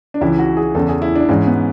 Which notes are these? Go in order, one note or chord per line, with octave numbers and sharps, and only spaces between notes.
D4
C#2 C#3 E3 E4
F#4
G#4
E2 C#3 E3 A4
G#4
E4
D4
G#2 E3 C#4
B3